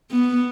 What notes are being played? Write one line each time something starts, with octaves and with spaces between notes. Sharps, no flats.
B3